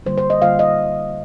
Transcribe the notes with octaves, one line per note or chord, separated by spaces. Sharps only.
D3 G3 A#3 F4 C5
C5
D#5
D3 G3 A#3 F4 F5
D#5